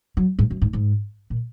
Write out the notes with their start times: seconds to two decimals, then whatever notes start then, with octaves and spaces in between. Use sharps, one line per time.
0.17 F#3
0.39 G#2
0.50 F#2
0.62 G#2
0.73 G#2
1.30 A#2